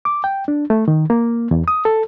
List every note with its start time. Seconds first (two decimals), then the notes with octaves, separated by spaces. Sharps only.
0.05 D6
0.24 G5
0.48 D4
0.70 A3
0.88 D#3
1.10 A#3
1.51 E2
1.68 D#6
1.85 A4